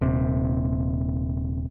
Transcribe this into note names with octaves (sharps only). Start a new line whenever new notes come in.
D#1 C3